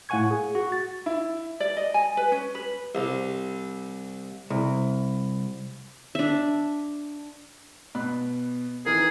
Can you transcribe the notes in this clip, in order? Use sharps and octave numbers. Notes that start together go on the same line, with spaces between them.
A2 F5 F#5 G#5 C#6 G#6
G#4
F#4
A6
E4
D5
D#5
G#5
B4
C#4
B4
C2
C2
D4 E5
B2 B5 F#6
D#3 E3 G#4 A#4